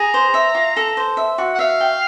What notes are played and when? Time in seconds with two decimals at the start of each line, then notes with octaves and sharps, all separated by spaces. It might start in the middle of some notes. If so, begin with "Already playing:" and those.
Already playing: G#4 A#5
0.14 C5
0.34 E5
0.55 F4
0.76 A4
0.97 C5
1.17 E5
1.38 F#4
1.55 F#5
1.59 E5 F5
1.80 G5